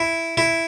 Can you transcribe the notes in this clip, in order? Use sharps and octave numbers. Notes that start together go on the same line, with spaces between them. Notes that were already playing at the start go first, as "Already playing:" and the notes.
Already playing: E4
E4